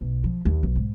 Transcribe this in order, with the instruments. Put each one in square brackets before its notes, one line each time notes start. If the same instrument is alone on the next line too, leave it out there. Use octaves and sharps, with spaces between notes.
[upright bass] B1
F3
D#2
B1
G#2